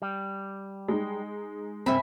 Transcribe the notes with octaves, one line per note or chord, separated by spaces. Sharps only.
G3
G#3 D#4
C2 G2 C4 E5 G#5 B5